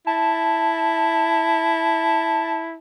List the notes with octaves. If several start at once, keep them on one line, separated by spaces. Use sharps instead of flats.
E4 A5